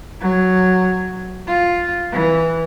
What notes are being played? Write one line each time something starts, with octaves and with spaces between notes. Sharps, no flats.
F#3
F4
E3